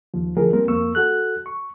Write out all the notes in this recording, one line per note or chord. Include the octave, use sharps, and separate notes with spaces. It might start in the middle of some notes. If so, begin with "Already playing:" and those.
D#2 F3
D3 E3 F3 A3 G#4 A#4
G3 A#3 C4 A#4
F2 A#3 C#6 E6
F#4 A4 F#6
C#6